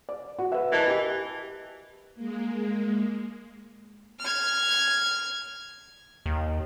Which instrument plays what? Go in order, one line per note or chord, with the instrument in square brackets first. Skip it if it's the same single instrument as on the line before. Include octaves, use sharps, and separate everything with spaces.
[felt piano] D5
F#4
B4 E5
[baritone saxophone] E3 [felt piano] A#4 D#5 A5
[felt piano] G4 D#5
[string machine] G#3 A#3
[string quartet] F6 G#6
[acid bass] D#2